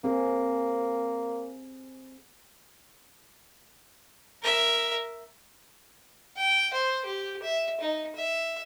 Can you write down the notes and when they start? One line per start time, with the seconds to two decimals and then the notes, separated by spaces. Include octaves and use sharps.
0.04 A#3 C4 G#4
4.43 A#4 E5
6.37 G5
6.73 C5
7.05 G4
7.42 E5
7.80 D#4
8.15 E5